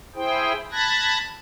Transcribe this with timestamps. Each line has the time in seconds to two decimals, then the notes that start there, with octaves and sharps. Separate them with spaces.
0.15 E4 G#4 C5 G5
0.71 A5 B5 F#6 G#6 A#6